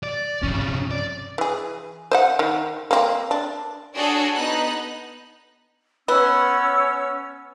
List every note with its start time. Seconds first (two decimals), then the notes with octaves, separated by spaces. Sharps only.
0.03 D5
0.42 G2 C3 F3 C#4
0.91 D5
1.38 E3 G#4
2.11 C5 D#5 F#5
2.39 D#3
2.91 A#3 C4
3.31 D4
3.95 D4 F#4 G#4 A4 C#5
4.35 B3 D#4 F#6
6.08 B3 C#4 E6